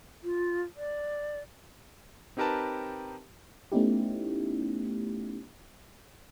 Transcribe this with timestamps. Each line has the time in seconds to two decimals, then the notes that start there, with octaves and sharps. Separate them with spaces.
0.24 F4
0.77 D5
2.37 C4 D#4 G4 A#4 B4 A5
3.72 A3 B3 C#4 D#4 E4 G4